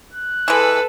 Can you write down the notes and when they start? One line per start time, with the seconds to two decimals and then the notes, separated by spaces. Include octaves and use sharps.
0.14 F#6
0.48 E3 G#3 A4 B4